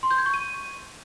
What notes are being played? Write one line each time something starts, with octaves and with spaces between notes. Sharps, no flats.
C6
G6
G#6
C#6
D#7